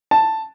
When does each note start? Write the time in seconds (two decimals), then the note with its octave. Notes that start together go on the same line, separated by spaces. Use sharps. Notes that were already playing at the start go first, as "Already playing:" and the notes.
0.11 A5